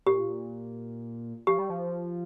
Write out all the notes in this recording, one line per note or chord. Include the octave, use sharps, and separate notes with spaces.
A#2 G4
F3 G4
G3
F3